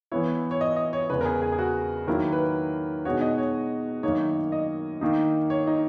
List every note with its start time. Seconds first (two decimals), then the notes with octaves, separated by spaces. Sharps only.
0.12 E3 B3 E4 C#5
0.51 C#5
0.61 D#5
0.76 D#5
0.93 C#5
1.09 E2 C#3 G#3 B4
1.21 A#4
1.25 G#4
1.41 G#4
1.52 G#4
1.58 F#4
2.07 D#3 F#3 A#3 E4 A#4
2.32 B4
3.05 B2 G#3 D#4 F#4 C#5
3.21 D#5
3.38 C#5
4.03 F#2 D#3 A#3 D#4 C#5
4.52 D#5
5.01 D#3 A#3 D#4
5.50 C#5
5.67 D#4